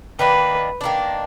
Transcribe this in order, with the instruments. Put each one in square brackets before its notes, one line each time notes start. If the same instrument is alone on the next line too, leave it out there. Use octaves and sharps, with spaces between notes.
[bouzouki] D#3 A#3 D4 [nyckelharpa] B4
[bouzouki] D#3 A#3 D4